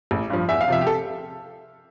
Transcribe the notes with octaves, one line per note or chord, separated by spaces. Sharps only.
A1
G2 F3
E2 E5
F5
C3 F3 E5
G4
A4